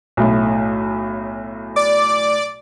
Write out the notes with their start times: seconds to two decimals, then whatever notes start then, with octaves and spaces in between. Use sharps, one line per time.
0.17 B1 A2
1.76 D5 D6